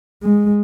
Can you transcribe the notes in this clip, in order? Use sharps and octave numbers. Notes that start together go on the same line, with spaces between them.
G#3